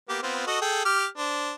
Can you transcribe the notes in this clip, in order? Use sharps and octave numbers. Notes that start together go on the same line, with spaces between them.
A#3 B3 G4
B3 C4 F4
F#4 A4 D#5
G#4 A4 G5
G4 D6 F6
D4 C5